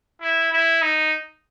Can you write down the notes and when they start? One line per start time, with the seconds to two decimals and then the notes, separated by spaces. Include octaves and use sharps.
0.21 E4
0.52 E4
0.82 D#4